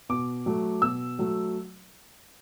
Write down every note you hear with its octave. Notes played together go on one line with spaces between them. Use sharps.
B2 D6
F#3 A3
B2 E6
F#3 A3